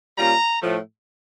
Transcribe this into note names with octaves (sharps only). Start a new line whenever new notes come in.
A#2 G3 C#4 F4 A#5
A2 F3 A3